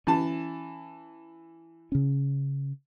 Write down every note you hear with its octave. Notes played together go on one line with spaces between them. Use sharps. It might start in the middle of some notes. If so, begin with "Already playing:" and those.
E3 C#4 A5
C#3 C#4